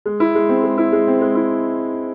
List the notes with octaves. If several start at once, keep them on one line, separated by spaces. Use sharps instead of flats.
G#3
E4
G#3
C4
G#3
E4
G#3
C4
G#3
E4